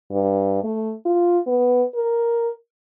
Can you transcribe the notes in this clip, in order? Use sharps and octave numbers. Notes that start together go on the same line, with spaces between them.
G2
A3
F4
B3
A#4